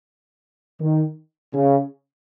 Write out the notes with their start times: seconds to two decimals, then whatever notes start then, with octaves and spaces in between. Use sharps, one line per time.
0.81 D#3
1.54 C#3